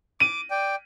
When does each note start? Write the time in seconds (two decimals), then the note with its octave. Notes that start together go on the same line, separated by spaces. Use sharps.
0.20 D6 D#7
0.51 D5 G5